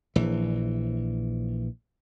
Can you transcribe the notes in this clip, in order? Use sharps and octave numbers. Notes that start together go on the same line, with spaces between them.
A#1 E3